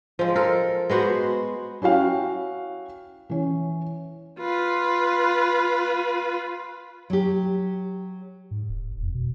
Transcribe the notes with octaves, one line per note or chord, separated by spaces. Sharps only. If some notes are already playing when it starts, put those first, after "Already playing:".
F3 G#3
A4 A#4
G#3 B3 F#4 C5
C#4 E4 F#4 F5 G5
E3 C#4
F4 B4
F#3 G4
G#2
D1
E1
F2
B2